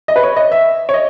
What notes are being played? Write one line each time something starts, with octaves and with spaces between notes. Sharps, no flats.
D#5
B4
C#5
D#5
E5
C#5
D#5